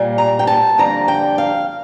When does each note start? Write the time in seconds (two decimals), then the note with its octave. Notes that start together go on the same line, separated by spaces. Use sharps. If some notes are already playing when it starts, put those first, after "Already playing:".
Already playing: A#2 G3 A#3
0.18 A#5
0.39 G5
0.47 A5
0.78 F2 D3 G3 A#3 A#5
1.08 G5
1.38 F5